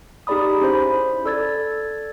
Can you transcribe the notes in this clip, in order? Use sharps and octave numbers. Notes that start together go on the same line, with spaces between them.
D#4 G4 G#4 D5 B5 D#6
C#4 E4 C5 B5
A4 D5 E6 G#6 A6